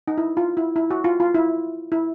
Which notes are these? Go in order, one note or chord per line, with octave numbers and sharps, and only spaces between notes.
D#4
E4
F4
E4
E4
F#4
F4
F4
E4
E4